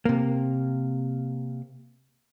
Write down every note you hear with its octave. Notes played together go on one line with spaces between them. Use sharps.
C3 A#3